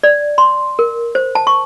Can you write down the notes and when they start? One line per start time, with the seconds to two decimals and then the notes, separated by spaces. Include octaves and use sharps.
0.03 D5
0.38 C6
0.79 A#4
1.15 C5
1.35 A5
1.47 C#6